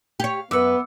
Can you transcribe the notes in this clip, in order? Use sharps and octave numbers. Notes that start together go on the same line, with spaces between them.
G4 C#5 F5
F#2 B3 B4 E5 D6 E6 C#7